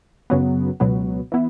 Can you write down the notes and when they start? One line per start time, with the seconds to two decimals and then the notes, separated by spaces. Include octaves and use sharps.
0.30 F#2 C#3 F#3 B3
0.80 C#2 B2 F#3 B3
1.32 E3 B3 E4